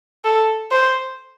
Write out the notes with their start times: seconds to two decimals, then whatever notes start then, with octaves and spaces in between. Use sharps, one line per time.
0.25 A4
0.71 C5